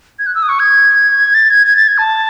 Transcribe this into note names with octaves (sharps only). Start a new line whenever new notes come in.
G#6
F#6
E6
D#6
C#6
G#6
A6
G#6
G#6
A6
G#6
A5